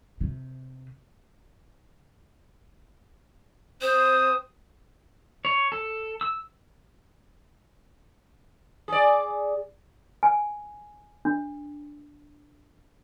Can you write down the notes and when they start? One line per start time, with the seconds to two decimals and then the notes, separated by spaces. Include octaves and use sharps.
0.21 C3
3.81 C4 C5 D#6
5.45 C#5
5.72 A4
6.21 E6
8.88 G#4 D5
10.23 G#5
11.25 D4